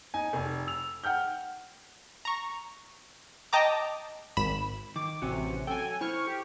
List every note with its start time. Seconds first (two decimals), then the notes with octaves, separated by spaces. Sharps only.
0.14 D#4 G#5
0.33 F1
0.67 E6 F7
1.04 F#5 G5 F6 G6
2.25 A#5 C#6
3.53 D#5 G5 A5 A#5 D6
4.37 G#1 B5 E7
4.96 D#3 D6
5.22 A1 C3 C4 C#4 F#4
5.67 F#3 A4 G5 G#5
6.01 E4 C5 C#6 F6
6.27 G4